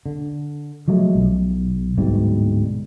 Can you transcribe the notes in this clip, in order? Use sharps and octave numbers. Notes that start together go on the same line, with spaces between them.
D3
F3 F#3 G#3 A3
B1
D1 G#2 B2 G3